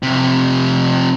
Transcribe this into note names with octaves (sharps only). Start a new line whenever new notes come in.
F2 C3